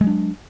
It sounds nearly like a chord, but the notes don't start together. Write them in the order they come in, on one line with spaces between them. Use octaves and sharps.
G#3 F#3 D4